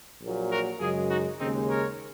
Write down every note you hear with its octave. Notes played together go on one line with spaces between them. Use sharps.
A#1 A#2 F#3
F#4 A#4
F#2 C#3 G#3 F4 G#4
D#4 F#4
D#2 C#3 G#3 C4 D#4
A#4 C#5